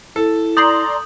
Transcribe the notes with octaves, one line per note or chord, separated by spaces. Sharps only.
E4 A4
D5 A#5 C6 D#6 G6 F#7